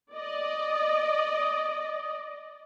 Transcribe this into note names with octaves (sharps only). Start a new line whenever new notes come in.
D5 D#5